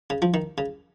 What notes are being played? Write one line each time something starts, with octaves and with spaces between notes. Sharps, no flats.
C#3
F3
D#3
C#3